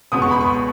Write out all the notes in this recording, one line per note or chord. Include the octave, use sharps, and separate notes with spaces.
C#2 B2 G#3 B3 D#6
C#6
B5
C#6